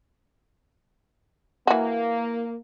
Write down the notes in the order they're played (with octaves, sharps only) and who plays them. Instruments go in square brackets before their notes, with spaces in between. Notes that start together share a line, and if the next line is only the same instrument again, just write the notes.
[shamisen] E3 F#4 [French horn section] A#3